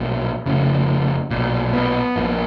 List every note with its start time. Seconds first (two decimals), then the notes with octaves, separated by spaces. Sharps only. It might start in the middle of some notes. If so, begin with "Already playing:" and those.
Already playing: B1 A#2
0.46 F1 F2 C#3
1.31 B1 A#2
1.73 B3
2.16 A#1 A#2